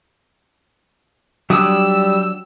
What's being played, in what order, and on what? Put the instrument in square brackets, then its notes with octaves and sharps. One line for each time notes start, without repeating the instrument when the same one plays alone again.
[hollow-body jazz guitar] F#3 D4 [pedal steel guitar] G3 D#6 [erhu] E6